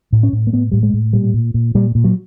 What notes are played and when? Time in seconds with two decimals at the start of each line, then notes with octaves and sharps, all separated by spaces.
0.13 A2
0.23 C#4
0.33 A2
0.47 A#3
0.53 A2 B3
0.72 A2 G3
0.83 G#3
0.94 A2
1.13 A#2 G3
1.34 A#2
1.54 A#2
1.75 A#2 G3
1.95 A#2
2.04 F#3